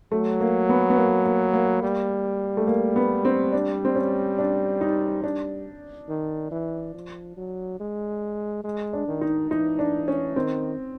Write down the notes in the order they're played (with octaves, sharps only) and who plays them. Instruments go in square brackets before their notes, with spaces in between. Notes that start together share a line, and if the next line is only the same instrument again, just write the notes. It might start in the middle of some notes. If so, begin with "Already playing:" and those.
[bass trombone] F#3 [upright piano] A3
[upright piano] A#3
B3
B3
A#3
A#3
A#3
[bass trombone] G3
[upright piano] A3
A#3
B3
C4
D4
C4
C#4
D4
D#4
[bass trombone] G3 [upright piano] D4
[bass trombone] D#3
E3
F3
F#3
G#3
G#3
[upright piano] D4
[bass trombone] D#3
[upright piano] D#4
[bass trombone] E3 [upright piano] D#4
[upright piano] D4
C#4
[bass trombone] D#3 [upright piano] C4